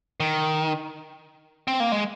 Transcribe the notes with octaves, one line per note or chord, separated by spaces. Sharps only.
D#3
C4
A#3
G#3